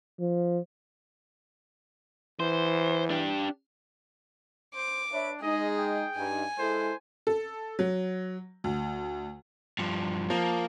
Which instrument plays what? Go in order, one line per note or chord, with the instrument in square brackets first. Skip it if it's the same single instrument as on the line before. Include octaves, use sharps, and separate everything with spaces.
[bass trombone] F3
[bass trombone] E3 [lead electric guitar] C5
[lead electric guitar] D4 G4
[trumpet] C5 [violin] D6
[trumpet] D4 [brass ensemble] B4 C#5 E5
[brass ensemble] G#3 D#4 [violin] G#4 [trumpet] D#5
[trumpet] G5
[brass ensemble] G2 D#4 [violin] G#5
[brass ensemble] G#3 E4 A4 [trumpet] C5
[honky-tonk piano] A4
F#3
D2
[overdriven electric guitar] G2 F3
[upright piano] F3 [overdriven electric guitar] A#3